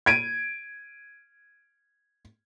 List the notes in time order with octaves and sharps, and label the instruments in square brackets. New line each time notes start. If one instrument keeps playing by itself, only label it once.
[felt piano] G#6 D7 D#7